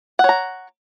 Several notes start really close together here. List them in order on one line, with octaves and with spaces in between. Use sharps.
F#5 C#5 A#5